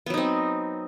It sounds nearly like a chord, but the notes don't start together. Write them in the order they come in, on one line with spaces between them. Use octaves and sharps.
B3 F#3 D#4 C4